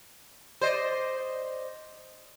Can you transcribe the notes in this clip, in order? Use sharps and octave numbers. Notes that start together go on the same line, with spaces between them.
C5 D5 D#5